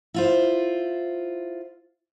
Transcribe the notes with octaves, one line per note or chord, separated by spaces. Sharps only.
E4 F4 C5